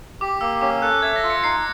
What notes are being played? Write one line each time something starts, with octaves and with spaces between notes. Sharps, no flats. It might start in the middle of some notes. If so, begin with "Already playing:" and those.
G4 D6
A#3 E6
C#4 D6
A4 F#6
E5 G#6
A#6
F4
C#7
D#4 C7